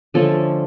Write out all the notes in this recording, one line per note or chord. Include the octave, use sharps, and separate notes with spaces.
D3 F3 A3 C#4 A4